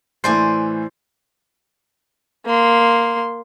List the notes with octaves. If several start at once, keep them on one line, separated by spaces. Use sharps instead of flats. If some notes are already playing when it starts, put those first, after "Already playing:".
A2 E3 C5 D5 G#5 C7
A#3 C6